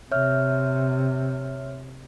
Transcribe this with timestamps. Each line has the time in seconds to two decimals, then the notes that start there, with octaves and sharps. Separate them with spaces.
0.12 C3 C#5 E5 F6